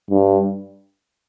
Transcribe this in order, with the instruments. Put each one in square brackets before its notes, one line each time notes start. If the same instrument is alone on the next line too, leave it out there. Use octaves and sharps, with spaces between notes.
[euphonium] G2